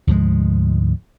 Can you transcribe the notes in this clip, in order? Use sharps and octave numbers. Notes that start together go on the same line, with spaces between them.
D2 G#2 F3 G#3